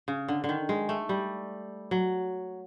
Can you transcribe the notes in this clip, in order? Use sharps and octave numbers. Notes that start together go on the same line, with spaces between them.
C#3
D3
D3
D#3
G#3
A3
G3
F#3